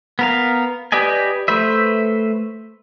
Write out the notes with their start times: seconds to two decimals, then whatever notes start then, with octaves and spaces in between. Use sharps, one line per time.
0.19 B3 A#4 F5
0.92 G4 B4 D5 D#5 G#5
1.48 A3 B4 C5 E5